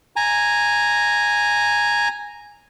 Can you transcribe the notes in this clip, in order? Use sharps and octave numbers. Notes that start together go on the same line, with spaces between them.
G#5 A#5